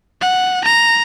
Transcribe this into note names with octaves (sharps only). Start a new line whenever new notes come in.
F#5
A#5